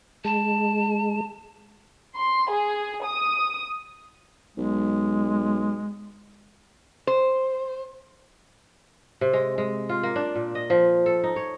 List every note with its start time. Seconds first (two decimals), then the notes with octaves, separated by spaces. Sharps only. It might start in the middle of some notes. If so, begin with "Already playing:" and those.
0.25 G#3 A5
2.16 C6
2.51 G#4
3.05 D#6
4.57 B1 G#3
7.07 C5
9.21 C3
9.33 G#3
9.58 G#3
9.89 F4
10.03 A#3
10.16 D4
10.35 A#2
10.55 D#5
10.70 F3
11.06 A4
11.24 D#4
11.36 C#5